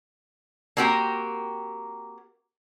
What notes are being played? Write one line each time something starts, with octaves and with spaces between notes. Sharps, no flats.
A#3 C4 F#4 G4 A#4